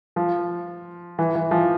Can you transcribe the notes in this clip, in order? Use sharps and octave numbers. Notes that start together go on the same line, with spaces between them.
F3
E3
E3
F3